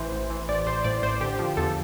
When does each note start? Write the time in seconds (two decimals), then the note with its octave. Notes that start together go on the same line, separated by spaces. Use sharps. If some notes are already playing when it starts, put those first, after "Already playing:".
Already playing: A1 E3 C5
0.12 A1
0.30 E3
0.49 A1 D5
0.66 A1 C5
0.84 A2 D5
1.03 A1 C5
1.21 D3 G4
1.39 F3
1.57 E2 A4